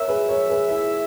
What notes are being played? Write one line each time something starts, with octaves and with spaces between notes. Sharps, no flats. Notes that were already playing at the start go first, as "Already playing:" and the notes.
Already playing: A#4 C#5 E5
G#4 B4
A#4 C#5
G#4 B4
E4 G#4